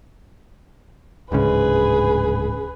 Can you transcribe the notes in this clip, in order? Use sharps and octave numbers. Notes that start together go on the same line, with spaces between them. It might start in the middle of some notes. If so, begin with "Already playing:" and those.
D1 G#2 C#3 G#4 B4